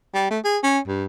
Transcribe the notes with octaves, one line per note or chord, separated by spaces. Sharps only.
G3
A3
G#4
C#4
G2